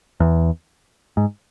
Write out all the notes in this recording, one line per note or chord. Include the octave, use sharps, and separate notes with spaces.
E2
G#2